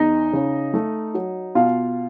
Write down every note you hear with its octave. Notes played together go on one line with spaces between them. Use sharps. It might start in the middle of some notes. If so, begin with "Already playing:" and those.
Already playing: E2 D#4 D#5
C#3
A3
F#3
B2 F4 F5